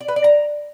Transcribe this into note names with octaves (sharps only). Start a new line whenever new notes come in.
D5
B4
D5
A#5